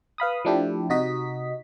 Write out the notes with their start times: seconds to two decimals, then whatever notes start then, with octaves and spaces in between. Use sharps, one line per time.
0.18 B4 F5 B5 D#6
0.45 F3 A3 D4 E4 G4
0.90 C3 D#4 F#4 D#5 B6